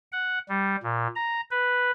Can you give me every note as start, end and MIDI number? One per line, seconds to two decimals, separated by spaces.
0.12 0.39 78
0.49 0.76 55
0.83 1.07 46
1.15 1.41 82
1.51 1.91 71